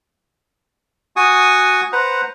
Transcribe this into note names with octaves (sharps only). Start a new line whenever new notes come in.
F#4 G#5 C#6 D#6
B4 C5 F#5 A#5